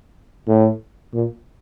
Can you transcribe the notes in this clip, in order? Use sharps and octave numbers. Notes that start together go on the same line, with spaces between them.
A2
A#2